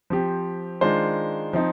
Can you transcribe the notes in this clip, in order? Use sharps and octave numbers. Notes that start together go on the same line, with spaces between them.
F3 C4 G4
D#3 G#3 D4 F4 C5
F3 C4 D#4